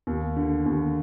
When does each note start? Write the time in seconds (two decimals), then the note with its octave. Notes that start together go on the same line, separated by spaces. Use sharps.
0.07 D#2
0.36 D3
0.66 D#2